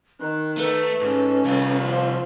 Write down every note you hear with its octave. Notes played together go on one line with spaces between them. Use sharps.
D#3 F#6
A3 B4
G#2 C#4 A4
C2 F4
F3